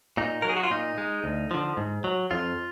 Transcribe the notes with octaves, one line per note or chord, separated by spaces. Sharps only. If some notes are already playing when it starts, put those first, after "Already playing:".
A#2 D#4
F#3 A#4
G#4
F#4
F4
A#2 D#4
G#3
D2
D3 F3
G#2
F#3
F2 F4